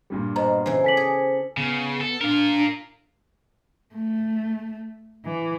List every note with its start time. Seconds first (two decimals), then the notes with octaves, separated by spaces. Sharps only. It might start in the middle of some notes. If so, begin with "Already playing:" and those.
0.10 G2 A#2 G3
0.36 B2 C5 A#5
0.66 C#3 E3 C5
0.84 A4 G#5 D6 B6 F#7
0.97 G#4
1.57 C#3 B3
2.01 A4
2.21 D4 F4 A#4
3.94 A3
5.24 E3